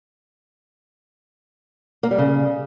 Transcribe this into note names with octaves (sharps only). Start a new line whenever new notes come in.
A#3
G3
C#3